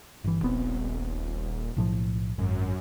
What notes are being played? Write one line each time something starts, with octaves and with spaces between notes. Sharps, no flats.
G1 E3
D#1 A#1 B3 C4
B1 A2 F3
G#1 F#2